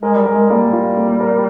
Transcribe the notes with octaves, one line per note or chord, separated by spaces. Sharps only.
G#3 A#4
G3
G#3 A#4
G3 A#3
F4
A#3
A#4